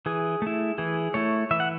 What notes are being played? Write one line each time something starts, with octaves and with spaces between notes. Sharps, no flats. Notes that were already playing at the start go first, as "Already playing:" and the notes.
E3 G#4
A3 E4
E3 G#4
A3 E4 C#5
E3 E5
F#5